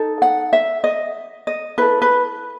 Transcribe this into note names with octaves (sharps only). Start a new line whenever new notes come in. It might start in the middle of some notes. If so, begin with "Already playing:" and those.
Already playing: D#4 A4
F#5
E5
D#5
D#5
E4 A4 B4
B4